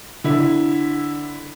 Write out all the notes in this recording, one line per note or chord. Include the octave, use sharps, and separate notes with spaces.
D3 E4